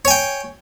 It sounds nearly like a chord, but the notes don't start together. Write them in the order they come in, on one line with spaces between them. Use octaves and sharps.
C#5 G#5 G5